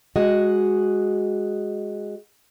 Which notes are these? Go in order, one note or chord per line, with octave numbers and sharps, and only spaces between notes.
G#3 F#4 G#4 D#5